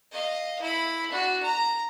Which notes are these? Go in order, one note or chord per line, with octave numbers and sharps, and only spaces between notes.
D#5 F5
E4 B5
D4 F#4
A#5